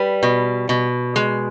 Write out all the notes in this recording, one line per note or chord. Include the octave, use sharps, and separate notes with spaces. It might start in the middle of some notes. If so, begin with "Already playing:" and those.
Already playing: G3 B4
B2
B2
G#3